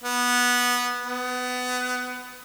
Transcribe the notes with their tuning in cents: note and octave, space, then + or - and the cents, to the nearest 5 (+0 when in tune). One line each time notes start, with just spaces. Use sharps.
B3 -10
B3 +20